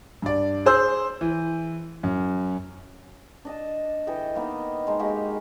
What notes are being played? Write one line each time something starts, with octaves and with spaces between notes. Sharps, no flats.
G2 D5
G#4 C5 E6 G6
E3
F#2
D4 D#5 A5
E3 A4 D#5 G5
A#3 B3 D#4
G#3 D#4
G#3 A#3 F#4 G4